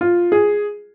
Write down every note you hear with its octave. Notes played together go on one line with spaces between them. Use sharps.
F4
G#4